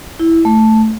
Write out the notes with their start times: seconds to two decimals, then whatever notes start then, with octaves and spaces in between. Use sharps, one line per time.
0.19 E4
0.45 A3